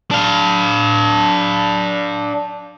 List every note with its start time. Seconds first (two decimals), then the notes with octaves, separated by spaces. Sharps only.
0.11 D4 F5